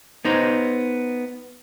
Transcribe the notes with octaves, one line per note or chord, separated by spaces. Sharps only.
B3 D#4 C5